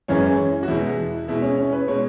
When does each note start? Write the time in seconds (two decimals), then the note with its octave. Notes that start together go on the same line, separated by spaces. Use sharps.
0.08 F#2 E3 G#3 C#4
0.63 F#4
0.68 E2 B2 G#3 E4
1.28 B2 G#3 E4
1.42 C#4
1.58 C#4
1.73 B4
1.88 B2 G#3 C#5